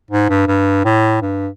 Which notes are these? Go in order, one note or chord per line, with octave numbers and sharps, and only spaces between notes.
G#2
G2
G2
A2
G2